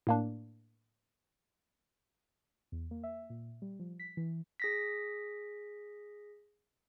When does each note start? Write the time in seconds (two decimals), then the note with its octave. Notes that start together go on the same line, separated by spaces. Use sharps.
0.07 A2 A#3 D4
2.72 E2
2.91 A#3
3.03 E5
3.30 A#2
3.62 G3
3.79 F3
3.99 B6
4.17 E3
4.60 G#4 A#6 B6